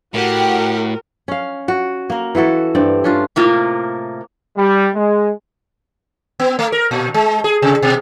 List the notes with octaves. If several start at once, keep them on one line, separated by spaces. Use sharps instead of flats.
A2 F#4 G4 A#4 F#5
C#4 F5
F#4
A#3 A#4
E3 E4 F#4 A4
G2 A3 C4 D5
C#4 D4 F4
A2 C3 A#3 E4 F4
G3
G#3
B3
A3
A#4
A#2
G#3
G#4
C3
B2